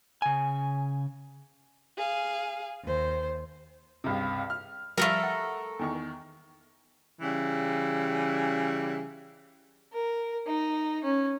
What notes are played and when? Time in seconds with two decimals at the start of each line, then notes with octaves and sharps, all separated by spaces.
0.22 C#3 G#5
1.96 G#4 F5
2.83 D#2 C5
4.04 C#2 G2 C3
4.50 F6
4.98 F3 G3 A3 F4 A4 A#4
5.23 F#5
5.79 E2 D#3 C#6
7.21 C#3 E3 G3
9.93 A#4
10.47 D#4
11.04 C#4